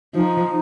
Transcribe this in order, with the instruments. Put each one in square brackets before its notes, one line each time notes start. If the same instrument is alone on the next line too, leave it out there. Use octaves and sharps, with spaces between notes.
[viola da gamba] F3 [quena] D#4